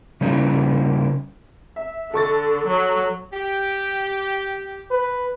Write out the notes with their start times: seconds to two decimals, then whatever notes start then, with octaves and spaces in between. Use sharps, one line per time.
0.21 C#3 G3 A#3 C#4 D#4
1.76 E5
2.14 D3 A4 C#6 A6
2.67 F#3
3.33 G4
4.91 B4